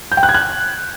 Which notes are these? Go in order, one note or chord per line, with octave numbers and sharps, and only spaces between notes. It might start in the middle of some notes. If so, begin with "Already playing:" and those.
G6
G5
F#6
G#6
F#6